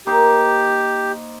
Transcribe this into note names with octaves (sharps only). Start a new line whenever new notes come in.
A#3 D#4 G4 C5